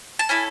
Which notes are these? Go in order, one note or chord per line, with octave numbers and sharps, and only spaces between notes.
A5
C#4 E4 A4 G#5 B5